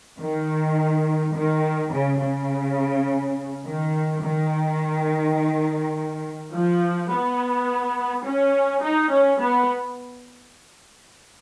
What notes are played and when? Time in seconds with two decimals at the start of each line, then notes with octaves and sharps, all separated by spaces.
0.20 D#3
1.34 D#3
1.92 C#3
2.20 C#3
3.65 D#3
4.22 D#3
6.53 F3
7.10 B3
8.25 C#4
8.83 D#4
9.11 C#4
9.40 B3